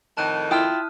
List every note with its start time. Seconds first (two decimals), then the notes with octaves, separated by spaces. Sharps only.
0.17 F2 A2 D#3 A5 F#6 D#7
0.51 E4 F4 G5 D#6 F6